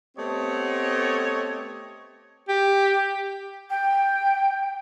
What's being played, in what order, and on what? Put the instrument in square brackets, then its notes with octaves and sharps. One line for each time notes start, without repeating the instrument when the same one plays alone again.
[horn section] A3 B3 C4 G4 C#5 D#5
[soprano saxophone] G4
[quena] G5